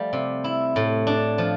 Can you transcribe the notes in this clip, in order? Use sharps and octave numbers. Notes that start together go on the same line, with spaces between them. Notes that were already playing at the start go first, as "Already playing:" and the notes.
Already playing: F3 G3 A3
C3
E4
A2
D4
F3